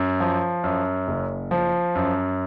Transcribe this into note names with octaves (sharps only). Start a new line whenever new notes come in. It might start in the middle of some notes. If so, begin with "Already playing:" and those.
Already playing: F#2
F3
F#2
F#1
F3
F#2